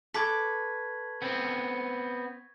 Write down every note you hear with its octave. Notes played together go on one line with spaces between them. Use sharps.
A4 B4 C#6 D6 G#6 B6
B3 C4